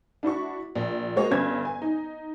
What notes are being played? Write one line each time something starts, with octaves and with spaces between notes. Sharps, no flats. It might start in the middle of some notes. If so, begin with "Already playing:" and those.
D4 E4 F#4 C#6
A#1
G#3 A#3 F#4 C5 C#5 D#5
G1 G2 C#4 G#6
G#5
D#4